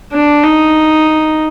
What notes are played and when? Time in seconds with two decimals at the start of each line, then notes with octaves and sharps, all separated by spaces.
0.12 D4
0.44 D#4